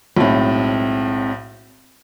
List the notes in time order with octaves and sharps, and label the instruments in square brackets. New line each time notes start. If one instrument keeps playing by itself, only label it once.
[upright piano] B1 A2 [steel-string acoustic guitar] G#3 C4